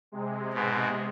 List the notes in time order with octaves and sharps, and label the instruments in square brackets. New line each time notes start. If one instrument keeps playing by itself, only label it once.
[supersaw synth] C3 G#3
[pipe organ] G#2 B2